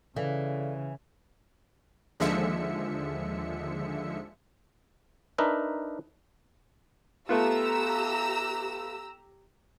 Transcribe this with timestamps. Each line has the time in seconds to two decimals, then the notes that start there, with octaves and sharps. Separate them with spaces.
0.16 C#3 E3 A4 D5 F5
2.20 D#2 D3 F3 G#3 E5 C#7
5.38 D4 D#4 A#4 B4 E5
7.29 A3 B3 F4 G4 A#5 E6